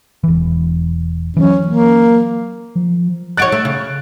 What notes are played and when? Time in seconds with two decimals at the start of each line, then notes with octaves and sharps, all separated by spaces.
0.24 E1 E3
1.37 E3 F#3 C#4
1.66 A#3
2.76 F3
3.37 D#4 F#4 C#5 F#6 A6 D7
3.52 A3
3.65 C#3